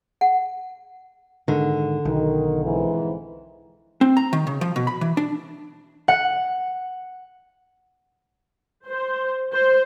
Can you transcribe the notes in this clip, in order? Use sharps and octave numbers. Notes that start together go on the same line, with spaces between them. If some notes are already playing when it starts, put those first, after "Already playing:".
F#5
G#2 D3 D#3
B1 D#3
F2 G#2 E3
C4
A#5
D#3
C#3
F3
B2
B5
E3
D4
F#5
C5
C5